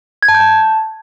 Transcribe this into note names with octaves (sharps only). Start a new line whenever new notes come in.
G#6
A5
G6
A5